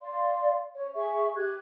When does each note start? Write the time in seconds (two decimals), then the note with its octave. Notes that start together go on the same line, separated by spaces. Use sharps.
0.01 D5 F5 C6
0.75 C#5
0.94 G#4 E5 C#6
1.36 G4 F#6 G#6